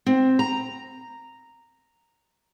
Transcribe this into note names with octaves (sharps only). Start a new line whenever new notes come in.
C4
A#5